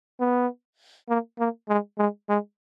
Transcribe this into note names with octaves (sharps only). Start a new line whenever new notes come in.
B3
A#3
A#3
G#3
G#3
G#3